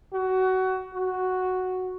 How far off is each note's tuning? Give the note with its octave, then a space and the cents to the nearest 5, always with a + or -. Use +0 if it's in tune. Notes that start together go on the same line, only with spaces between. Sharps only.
F#4 +20
F#4 +0